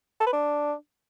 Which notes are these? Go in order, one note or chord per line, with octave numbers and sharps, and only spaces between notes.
A4
B4
D4